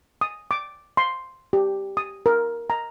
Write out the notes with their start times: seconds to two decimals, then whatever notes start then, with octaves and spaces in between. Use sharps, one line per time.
0.21 D#6
0.51 D6
0.97 C6
1.53 G4
1.97 D#6
2.26 A#4
2.70 A#5